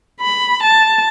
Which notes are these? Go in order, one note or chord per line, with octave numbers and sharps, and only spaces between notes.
B5
A5